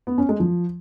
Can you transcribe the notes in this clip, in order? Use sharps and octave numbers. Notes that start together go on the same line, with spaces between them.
B3
C#4
G#3
F3